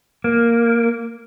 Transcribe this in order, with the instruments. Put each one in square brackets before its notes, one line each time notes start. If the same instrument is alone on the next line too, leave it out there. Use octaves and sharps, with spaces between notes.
[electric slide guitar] A#3